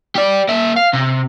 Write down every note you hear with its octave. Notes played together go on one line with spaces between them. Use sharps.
G4 D5
A#3 E5
F5
C3